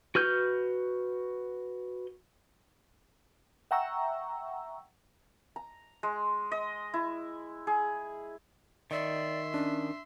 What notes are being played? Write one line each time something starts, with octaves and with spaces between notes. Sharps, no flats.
F#4 B4 F6 G6
E5 F#5 G5 A#5 C#6 E6
A#5
G#3
D#5
E4
G#4
D#3 D5 E5 C6
C#4 D4